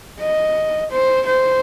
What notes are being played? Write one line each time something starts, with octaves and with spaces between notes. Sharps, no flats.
D#5
C5
C5